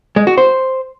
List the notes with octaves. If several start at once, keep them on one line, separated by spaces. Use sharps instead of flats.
G#3
F#4
C5